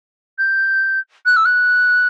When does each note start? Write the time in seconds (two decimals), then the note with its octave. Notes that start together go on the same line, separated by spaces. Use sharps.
0.38 G6
1.26 F#6
1.36 E6
1.45 F#6